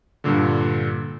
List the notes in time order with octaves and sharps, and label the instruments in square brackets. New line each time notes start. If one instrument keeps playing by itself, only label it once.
[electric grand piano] G2 A#2 D3